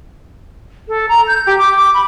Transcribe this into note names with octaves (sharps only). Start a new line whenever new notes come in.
A4
A#5
G6
G4
D6
D6
B5